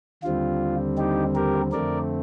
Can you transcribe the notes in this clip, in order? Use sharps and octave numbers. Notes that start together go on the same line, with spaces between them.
D#2 D3 G3 C4 F4
D#4 G4
G4 A#4
F2 D3 A3 C4 A#4 D5